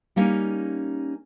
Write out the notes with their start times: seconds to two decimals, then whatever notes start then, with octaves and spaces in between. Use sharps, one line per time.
0.16 G3 A#3 C#4 D#4